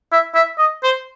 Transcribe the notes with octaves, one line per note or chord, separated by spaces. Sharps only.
E5
E5
D#5
C5